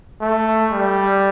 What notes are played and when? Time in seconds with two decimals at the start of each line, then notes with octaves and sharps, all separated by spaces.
0.21 A3
0.71 G3